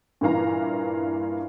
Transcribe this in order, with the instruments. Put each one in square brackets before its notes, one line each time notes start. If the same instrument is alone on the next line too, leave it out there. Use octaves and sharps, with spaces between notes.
[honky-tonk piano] G2 A#2 E3 F5 A#5